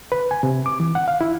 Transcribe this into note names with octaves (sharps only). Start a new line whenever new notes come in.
B4
G#5
C3
D6
E3
F#5
F5
E4